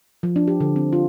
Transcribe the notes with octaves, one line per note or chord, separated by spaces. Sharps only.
F3
D4
G4
D3
C4
F4